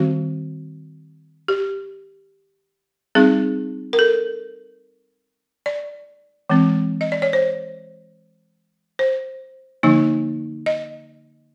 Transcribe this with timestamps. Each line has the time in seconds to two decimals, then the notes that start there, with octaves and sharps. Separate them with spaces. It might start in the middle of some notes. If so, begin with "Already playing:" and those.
Already playing: D#3 G3 C4 F#4
1.48 G4
3.15 G3 C4 D#4 G#4
3.93 A#4
3.99 A4
5.66 D5
6.50 E3 G#3 C4
7.01 D#5
7.12 D5
7.22 C#5
7.33 C5
8.99 C5
9.83 D3 F3 A#3 D#4
10.66 D#5